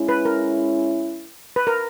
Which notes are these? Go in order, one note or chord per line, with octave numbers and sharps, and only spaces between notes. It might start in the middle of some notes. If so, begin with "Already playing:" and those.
Already playing: G#3 C#4 E4
B4
A#4
B4
A#4